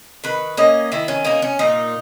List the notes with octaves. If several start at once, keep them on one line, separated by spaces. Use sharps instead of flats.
D#3 B4
A#3 C#4 D#5
D#3 E4
C#4
A#3 C#4 D#4
C#4
A#2 D#4